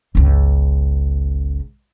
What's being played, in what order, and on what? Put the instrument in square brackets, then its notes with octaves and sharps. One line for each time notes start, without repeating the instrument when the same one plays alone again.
[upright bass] G1 C#2